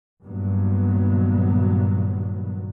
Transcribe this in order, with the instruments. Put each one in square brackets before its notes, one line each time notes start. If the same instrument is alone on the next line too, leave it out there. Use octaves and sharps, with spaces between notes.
[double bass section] G2 A#2 D#3 F#3 B3